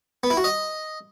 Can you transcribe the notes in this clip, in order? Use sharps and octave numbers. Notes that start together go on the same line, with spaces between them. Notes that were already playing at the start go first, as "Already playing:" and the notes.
B3
E4
F#4
D#5